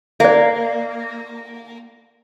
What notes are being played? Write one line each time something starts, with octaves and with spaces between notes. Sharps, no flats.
A#3 D5 D#5